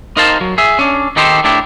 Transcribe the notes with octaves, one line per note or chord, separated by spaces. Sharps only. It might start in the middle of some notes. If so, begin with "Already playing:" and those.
D#4 A#4 C5 F5 A5
F#3
G#4 E5
C#4 D4
D#3 D#4 G4 A4 C5
A2 D4 E4 G4